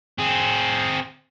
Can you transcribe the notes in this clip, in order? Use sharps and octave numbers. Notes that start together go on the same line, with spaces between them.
C4 G#4